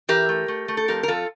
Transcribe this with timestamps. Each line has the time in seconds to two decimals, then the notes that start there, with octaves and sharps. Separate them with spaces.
0.09 E3 G4 A#4
0.29 A3
0.48 A3
0.68 A3
0.77 A4
0.88 F2 G4 A#4
1.03 A#4
1.08 F2 F4 A4